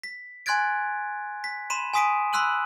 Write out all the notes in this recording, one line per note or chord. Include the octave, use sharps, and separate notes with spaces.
B6
G#5 C6 F#6 G#6 A6 D7
B6
B5 C6 D#7 E7
G#5 C6 D#6 B6 D7 D#7
B5 C6 E6 F#6 D#7 F#7